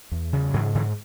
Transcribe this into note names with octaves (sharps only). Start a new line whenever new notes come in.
E2
C#3
G#2 E3 F#3
G#2 D3 E3